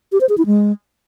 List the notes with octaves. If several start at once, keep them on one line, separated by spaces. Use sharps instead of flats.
G4
C5
G#4
E4
G#3